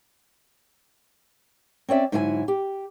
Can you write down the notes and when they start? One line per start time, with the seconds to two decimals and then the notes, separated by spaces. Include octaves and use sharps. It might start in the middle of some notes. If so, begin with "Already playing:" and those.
1.89 C4 C#4 D5 E5
2.12 G#2 D3 F#3 E4 A4 G#5
2.48 G4